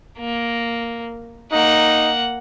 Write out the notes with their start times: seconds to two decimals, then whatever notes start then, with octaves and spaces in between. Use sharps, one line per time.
0.19 A#3
1.52 A#3 D#4 F#5